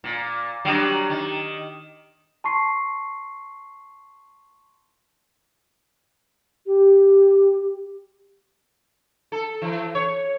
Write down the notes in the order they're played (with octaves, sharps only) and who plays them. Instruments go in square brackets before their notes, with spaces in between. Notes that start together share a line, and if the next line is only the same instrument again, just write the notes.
[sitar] A#2
F#3 G3 D4
D#3
[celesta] A5 C6 C#6 C7
[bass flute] G4
[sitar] A4
E3
C#5